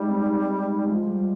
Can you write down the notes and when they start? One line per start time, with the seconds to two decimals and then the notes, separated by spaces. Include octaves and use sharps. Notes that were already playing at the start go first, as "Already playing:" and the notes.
Already playing: G3 G#3 D#4
0.10 C4
0.88 F3 G#3
1.07 G3